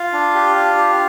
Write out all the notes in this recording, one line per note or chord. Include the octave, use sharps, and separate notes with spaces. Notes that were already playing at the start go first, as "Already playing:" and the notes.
Already playing: F4 F5
D4
G4
D4
G4